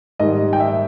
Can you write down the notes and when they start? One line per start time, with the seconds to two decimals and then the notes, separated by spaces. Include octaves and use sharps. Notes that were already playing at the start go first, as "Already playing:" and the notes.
0.19 G#2 D#3 G3 D#5
0.53 G5
0.60 E5